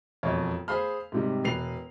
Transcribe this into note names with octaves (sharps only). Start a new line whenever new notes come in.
E1 F2 F4 C#5
G#4 C5 F5 B5 F6
G#2 C3 G3
E1 B4 C7 F7